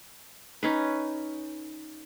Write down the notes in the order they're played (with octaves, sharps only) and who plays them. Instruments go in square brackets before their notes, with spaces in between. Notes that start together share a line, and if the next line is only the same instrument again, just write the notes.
[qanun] C#4 D#4 B4